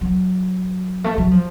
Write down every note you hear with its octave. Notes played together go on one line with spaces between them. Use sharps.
F#3
A3
F#3
F3